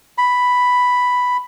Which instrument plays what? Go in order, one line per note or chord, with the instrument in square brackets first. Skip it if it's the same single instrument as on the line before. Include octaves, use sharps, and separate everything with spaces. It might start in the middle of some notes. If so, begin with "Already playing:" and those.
[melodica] B5